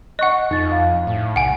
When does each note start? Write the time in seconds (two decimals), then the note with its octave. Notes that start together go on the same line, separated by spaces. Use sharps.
0.19 D#5 F#5 C#6 F#6
0.51 F2 D#4 A6
0.72 F5
1.07 A2
1.36 C2 F#5 G#5